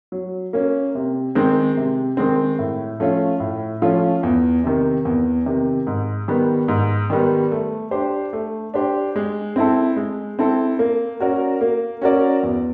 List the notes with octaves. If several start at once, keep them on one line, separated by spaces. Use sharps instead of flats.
F#3
A#3 C#4
C3
D#3 G#3 C4
C3
D#3 G#3 C4
A2
F3 A3 C#4 F4
A2
F3 A3 C#4 F4
E2
C3 D#3
E2
C3 D#3
G#2
D#3 G3 B3
G#2
D#3 G3 B3
A3
D4 G4 C5
A3
D4 G4 C5
G#3
C4 E4 A4
G#3
C4 E4 A4
A#3
C#4 F#4 A#4 D5
A#3
C#4 F#4 A#4 D5
E2